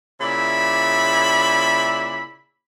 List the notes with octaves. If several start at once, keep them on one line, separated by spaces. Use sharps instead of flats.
A#2 C#3 E4 D5 E5 B5